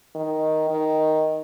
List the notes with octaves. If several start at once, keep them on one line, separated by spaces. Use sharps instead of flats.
D#3
D#3